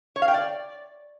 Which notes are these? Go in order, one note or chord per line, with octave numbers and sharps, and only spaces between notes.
C#5
F5
G5
D5